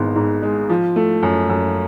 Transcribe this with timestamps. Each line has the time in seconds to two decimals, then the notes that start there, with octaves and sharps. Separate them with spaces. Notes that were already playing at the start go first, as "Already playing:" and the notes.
Already playing: G#1 G#2 G#3 B3
0.15 G#2
0.43 G#3
0.70 F3
0.96 A3
1.23 F#2
1.50 F#2